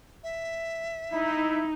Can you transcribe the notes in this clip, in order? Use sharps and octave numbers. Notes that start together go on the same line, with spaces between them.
E5
D#4 E4